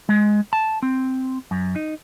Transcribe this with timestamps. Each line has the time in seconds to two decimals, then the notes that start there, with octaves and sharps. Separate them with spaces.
0.09 G#3
0.53 A5
0.82 C4
1.51 F#2
1.76 D#4